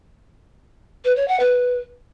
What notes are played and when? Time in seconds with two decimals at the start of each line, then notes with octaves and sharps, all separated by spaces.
1.04 B4
1.16 C#5
1.28 F#5
1.39 B4